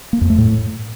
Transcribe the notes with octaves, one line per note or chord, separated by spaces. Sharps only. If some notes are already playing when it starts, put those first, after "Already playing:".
A#3
F2
A3
A2